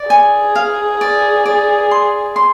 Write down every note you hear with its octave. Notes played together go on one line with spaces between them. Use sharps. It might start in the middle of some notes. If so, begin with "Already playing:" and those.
Already playing: D5
G#4 G#5
F5
D5
D5
C6
C6